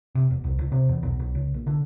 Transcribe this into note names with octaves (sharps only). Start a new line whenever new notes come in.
C3
E1
C2
C#2
C3
E2
B1
B1
C#2
A#1
D3